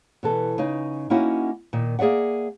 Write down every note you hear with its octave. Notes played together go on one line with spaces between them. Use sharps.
B2 E3 A4
C#3 D#4
A#3 C#4 D#4 E4 F#4 F#5
A#2 D#3
A#3 G#4 D5 E5 F#5